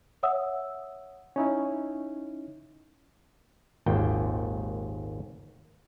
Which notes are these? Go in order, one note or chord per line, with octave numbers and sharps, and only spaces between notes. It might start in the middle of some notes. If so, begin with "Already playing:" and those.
C#5 E5 F#5 D#6 E6
C#4 D#4 E4
G#1 D#2 A#2 G5